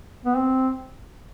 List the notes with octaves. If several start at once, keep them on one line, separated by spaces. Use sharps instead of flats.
B3
C4